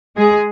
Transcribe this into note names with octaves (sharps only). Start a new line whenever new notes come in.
G#3 G#4